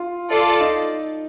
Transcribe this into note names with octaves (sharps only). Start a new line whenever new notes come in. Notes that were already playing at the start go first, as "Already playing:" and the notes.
Already playing: F4
F4 A4 D5
D#4